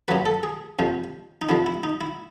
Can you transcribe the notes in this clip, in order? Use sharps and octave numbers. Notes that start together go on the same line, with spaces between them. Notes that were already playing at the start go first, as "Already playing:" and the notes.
F#2 C#3 F#3 B4
A4
G#4
F2 C3 F3
D#4
F2 C3 F3 E4
E4
D#4
E4